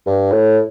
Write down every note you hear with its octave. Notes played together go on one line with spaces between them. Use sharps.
G2
A2